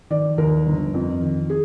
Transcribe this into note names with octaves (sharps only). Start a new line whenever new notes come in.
D#3 D5
D#2 A#4
G1
F2
D#3
G#4